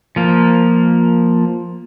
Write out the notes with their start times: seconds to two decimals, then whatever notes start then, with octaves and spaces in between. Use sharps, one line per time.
0.16 F3 A#3